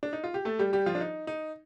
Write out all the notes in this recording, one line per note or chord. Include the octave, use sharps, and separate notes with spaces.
D4
D#4
F4
G4
A3 A4
G3 G4
G3 G4
F3 F4
D4
D#4
D#4